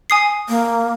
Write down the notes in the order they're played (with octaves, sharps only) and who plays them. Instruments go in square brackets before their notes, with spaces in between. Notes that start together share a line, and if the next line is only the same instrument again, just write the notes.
[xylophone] G#5 D#6 C7
[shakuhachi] A#3